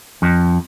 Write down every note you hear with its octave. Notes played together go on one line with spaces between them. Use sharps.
F2